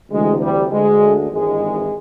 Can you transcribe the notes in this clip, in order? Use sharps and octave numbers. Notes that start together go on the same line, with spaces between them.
D2 C3 E3 G#3
G3
D2 D3 G#3
G#1 G2 E3 G#3